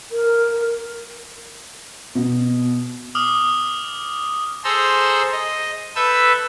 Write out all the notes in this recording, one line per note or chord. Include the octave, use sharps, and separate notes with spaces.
A#4
B2
D6 D#6 F6 G7
G#4 A4 C5 A#5 C6 E6
D#5
A4 B4 E5 E6 G6